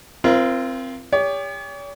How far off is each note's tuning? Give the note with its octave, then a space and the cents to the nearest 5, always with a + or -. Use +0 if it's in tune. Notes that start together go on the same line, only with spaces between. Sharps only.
C4 +0 F4 -30 A#4 +25
G4 +35 C#5 +45